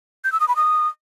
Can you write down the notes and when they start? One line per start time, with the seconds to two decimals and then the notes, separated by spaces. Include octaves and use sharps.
0.24 G6
0.32 E6
0.40 D#6
0.48 B5
0.56 D#6